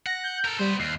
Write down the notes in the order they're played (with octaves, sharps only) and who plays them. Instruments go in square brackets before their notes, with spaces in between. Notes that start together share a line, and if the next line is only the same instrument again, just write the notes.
[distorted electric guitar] F#5 [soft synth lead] A#6
[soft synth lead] G6
[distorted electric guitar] A4 A#4
[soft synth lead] G3 [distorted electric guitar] B3 C5
[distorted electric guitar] D#2 [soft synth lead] C7